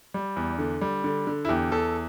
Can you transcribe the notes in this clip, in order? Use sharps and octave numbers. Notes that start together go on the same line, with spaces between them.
G3
E2
D3
G3
D3
D3
E4
E2 G4
E2 A4